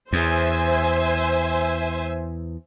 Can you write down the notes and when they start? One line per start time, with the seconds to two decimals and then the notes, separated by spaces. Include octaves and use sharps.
0.13 E2 C5 E5 G#5